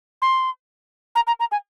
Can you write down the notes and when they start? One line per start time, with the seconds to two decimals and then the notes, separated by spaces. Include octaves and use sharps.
0.22 C6
1.15 A#5
1.27 A#5
1.40 A#5
1.52 G#5